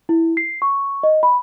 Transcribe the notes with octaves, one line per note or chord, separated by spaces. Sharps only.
E4
C7
C#6
D#5
B5